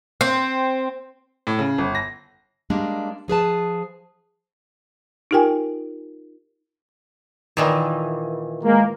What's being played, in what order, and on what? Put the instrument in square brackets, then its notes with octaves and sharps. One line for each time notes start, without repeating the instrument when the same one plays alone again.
[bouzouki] C4
[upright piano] A2
C#3
G1
A#6
[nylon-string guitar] G3 G#3 A#3 D4
F3 G#4 B4 A5
[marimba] D#4 F4 G4 A#4 G5 G#5
[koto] A#2 D#3 E3
[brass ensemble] G#3 A#3